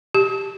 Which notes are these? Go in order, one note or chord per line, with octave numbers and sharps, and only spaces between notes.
G4